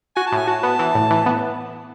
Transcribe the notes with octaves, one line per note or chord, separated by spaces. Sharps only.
F#4 G#5
A5
A2
G#5
F#4 A5
B3
E3
A2
E3
B3